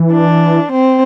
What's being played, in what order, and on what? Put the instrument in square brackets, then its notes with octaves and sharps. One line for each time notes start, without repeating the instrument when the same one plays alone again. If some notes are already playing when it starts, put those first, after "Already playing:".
Already playing: [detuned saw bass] E3
[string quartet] D4
C4